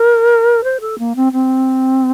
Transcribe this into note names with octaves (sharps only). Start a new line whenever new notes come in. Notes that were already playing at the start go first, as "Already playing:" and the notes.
Already playing: A#4
C5
A4
A#3
C4
C4